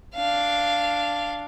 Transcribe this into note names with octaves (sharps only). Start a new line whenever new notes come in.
D4 F5